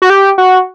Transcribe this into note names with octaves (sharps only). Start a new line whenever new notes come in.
F#4
G4
F#4